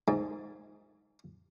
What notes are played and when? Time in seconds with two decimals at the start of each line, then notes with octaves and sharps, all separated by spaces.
0.08 G#2